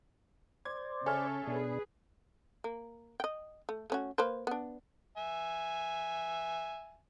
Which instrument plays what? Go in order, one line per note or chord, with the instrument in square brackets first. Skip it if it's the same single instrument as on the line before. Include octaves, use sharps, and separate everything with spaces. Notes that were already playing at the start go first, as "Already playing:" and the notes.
[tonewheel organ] C5 D5 [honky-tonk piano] G#6
[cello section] C#3 [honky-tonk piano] A4 C#5 E5 [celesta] G#5 F6
[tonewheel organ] B2 D4 [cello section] G#4 B4
[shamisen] A#3
D#5 G5
A3
A3 C#4 F#4
A#3 B4 C5
B3 D4
[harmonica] E5 G#5